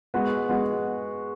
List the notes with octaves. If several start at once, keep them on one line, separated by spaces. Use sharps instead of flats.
G#3 B3 F#4
G#3 B3 F#4